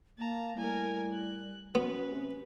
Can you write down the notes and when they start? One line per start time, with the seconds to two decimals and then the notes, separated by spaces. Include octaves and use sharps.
0.18 A#3 A5 A#5
0.57 A2 G3 A#4 G#5
1.13 F#6
1.75 F#2 B3 C#4 B4
2.12 C3